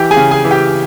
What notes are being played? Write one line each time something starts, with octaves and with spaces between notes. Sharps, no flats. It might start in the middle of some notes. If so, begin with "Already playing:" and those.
Already playing: E3 G4 G5
G#4 G#5
C#3
G#4 G#5
E3
G4 G5